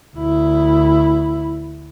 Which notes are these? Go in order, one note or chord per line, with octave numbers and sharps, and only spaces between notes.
D2 E4